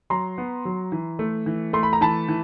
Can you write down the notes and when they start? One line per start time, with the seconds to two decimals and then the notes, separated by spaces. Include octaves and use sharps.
0.10 F#3 A#5 C6
0.38 B3
0.65 F#3
0.92 E3
1.19 A3
1.46 E3
1.73 A3 C6
1.83 B5
1.93 A#5
2.01 E3 A5 B5
2.28 E3